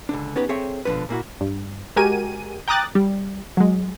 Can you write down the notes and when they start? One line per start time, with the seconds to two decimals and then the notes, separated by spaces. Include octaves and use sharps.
0.09 C#2 D3 D4
0.36 B3 C#4 D#4 G4 B4
0.49 C4 G#4 A4 C#5 E5 G5
0.85 B2 D3 F3 B3 D4 B4
1.09 A#2 A#3 E4 F#4
1.41 G2
1.96 G#3 F#4 G4 A#4 G#5 D#7
2.68 G5 A#5 D6 D#6 F#6 A6
2.95 G3
3.57 F#3 G#3